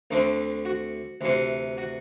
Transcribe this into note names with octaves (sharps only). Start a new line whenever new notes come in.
D2 D3 A3 C4
F#4
D2 C3 E3
F#4